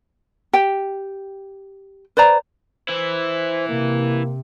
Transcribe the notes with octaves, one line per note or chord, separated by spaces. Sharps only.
G4 G5
B4 C5 D5 A#5
E3 E4 C5
C3 A#3